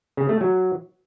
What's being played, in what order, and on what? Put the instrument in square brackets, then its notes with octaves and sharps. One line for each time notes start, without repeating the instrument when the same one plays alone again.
[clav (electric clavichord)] C#3
A3
F#3